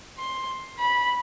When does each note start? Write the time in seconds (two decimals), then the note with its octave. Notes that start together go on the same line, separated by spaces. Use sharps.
0.18 C6
0.79 B5